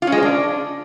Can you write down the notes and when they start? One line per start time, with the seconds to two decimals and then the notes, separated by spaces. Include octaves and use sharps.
0.02 F4
0.07 C#4
0.12 G#3
0.17 C5
0.23 D4